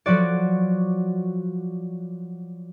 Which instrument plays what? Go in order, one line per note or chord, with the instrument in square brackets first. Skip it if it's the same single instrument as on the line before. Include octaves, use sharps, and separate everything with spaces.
[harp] F3 F#3 F#4 D5